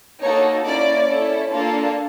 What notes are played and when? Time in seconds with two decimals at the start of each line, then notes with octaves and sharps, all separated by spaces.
0.21 A#3 D#4 F#4 A4 C#5
0.64 A#3 C#4 E4 D5
1.08 C#4 E4 A4
1.51 A#3 D4 F4 A4